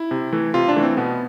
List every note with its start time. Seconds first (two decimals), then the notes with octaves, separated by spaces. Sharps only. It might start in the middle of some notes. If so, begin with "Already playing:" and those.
Already playing: E4
0.11 C3
0.32 E3 A3
0.54 C3 F4
0.68 D4
0.76 E3 A3
0.83 C4
0.97 B2 B3